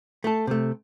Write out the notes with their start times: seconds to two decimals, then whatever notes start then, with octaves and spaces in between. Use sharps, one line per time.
0.24 A3 A4
0.47 C3 A3